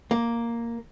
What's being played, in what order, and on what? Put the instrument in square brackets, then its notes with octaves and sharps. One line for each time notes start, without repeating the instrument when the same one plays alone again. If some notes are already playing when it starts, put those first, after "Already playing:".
[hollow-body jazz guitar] A#3